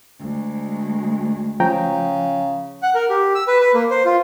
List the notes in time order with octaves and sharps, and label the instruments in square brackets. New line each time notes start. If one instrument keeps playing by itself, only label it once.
[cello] D2 G#3
[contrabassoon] C#3 [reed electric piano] F3 G5 A#5
[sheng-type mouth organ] F#5
A#4
G4
E6
B4
B4
A#3
C5
F4